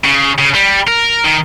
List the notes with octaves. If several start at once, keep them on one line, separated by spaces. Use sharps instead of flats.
C#3
C#3
G3
A#4
D#3